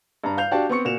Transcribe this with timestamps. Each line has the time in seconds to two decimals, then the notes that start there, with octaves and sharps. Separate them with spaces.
0.24 G2 A#5
0.38 F5 G6 F7
0.51 D4 F#4 G4 D5 F5 A5
0.69 B3 C4 C#6 C#7
0.85 A#2 F#4 E7 F7